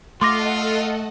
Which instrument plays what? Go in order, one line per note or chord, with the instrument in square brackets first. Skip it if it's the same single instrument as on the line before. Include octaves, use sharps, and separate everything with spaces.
[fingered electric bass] A3 [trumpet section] F4 [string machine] A4 D#5 F#5 [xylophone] C6 D6 A#6